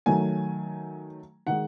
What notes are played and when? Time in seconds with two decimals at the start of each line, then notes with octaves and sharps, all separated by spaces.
0.06 D#3 F#3 A3 G#5
1.47 D#3 G#3 F#5